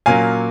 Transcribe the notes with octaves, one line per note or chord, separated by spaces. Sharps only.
A#2 F#3 A#3 C#4 F5 G#5